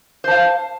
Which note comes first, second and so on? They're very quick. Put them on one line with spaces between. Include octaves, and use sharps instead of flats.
C5 A5 F5